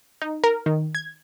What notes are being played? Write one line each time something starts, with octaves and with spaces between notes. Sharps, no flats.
D#4
A#4
D#3
G#6